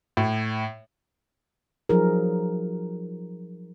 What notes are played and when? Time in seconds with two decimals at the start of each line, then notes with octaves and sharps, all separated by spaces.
0.17 A2
1.89 F3 F#3 D#4 G#4 A#4